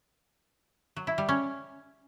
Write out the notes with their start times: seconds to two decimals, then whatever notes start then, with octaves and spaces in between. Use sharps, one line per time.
0.96 F#3
1.07 E4
1.18 G3
1.29 C#4